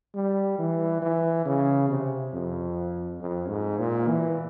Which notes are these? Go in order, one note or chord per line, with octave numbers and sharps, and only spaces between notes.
G3
E3
E3
C#3
C3
F2
F2
G#2
A#2
E3